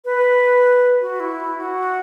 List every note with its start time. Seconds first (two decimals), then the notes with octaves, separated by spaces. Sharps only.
0.05 B4
1.01 F#4
1.20 E4
1.58 F#4